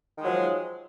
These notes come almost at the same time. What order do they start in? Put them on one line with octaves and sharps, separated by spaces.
D#3 G#3 F#3 F3